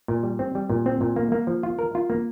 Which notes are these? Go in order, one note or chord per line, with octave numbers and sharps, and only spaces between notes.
A#2
G3
C4
G3
A#2
C4
A#2
A#3
A#3
F3
F4
A#4
F4
A#3